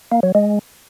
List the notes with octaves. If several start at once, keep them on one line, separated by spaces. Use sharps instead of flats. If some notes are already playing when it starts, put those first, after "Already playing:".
A#3
F#3
G#3